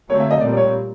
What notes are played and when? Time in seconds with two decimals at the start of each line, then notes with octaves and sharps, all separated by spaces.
0.09 D3 F#3 A3 C4 C#5
0.20 E5
0.31 D#5
0.41 A#2 G3 C4 D5
0.52 D5
0.57 C#5